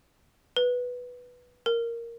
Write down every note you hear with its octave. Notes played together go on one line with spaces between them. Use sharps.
B4
A#4